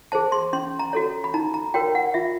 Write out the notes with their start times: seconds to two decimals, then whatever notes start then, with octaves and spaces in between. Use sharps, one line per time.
0.12 G#4 C5 A5
0.32 C6
0.53 C#4 C6
0.79 A#5
0.93 F#4 A4 C#5
1.24 B5
1.34 D#4 A#5
1.54 A#5
1.74 F#4 A#4 C#5 G5
1.95 F#5
2.14 F4 E5